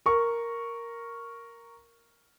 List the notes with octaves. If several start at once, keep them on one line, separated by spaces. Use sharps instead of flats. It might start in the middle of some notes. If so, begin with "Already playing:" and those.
A#4 C#6